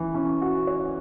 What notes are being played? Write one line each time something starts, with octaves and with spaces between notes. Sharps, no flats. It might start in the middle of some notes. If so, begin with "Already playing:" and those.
Already playing: E3 C#4
C#4
F#4
C#5